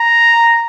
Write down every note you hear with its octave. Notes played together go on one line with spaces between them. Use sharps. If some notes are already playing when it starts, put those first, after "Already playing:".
Already playing: A#5